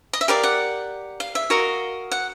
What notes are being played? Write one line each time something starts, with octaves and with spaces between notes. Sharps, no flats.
D#5
E5
G4 A#4 D5 F5
F#5
F5
E5
F#4 A#4 D#5 F5
F#5